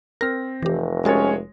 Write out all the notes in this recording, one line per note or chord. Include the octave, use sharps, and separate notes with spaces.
C4 A#4 F6 A#6
F1 E3 G4
G#3 C#4 F#4 A#4 C#5 A6